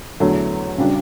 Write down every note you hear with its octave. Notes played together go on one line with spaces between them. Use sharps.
E2 D3 F#3 A3
C#3 G3 D4 F#4